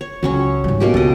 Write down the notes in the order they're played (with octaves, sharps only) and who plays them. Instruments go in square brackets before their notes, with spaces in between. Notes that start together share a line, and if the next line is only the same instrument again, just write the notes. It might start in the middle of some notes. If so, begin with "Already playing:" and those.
[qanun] C#5
[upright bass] C#2 F#2 [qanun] F#3 C#4 C#5
[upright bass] G#2 G3
[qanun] B2 A#3 G4
[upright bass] C#2 [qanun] A4 D#5